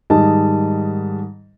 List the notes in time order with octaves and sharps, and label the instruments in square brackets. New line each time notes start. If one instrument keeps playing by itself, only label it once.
[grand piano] G#2 D#3 G3 D#5 A5